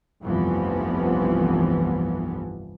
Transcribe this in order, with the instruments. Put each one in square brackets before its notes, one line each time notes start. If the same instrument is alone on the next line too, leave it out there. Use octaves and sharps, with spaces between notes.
[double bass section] F1 C2 G2 E3 F3 B3